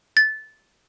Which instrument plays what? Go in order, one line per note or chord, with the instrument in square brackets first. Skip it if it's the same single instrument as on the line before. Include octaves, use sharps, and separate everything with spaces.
[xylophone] A6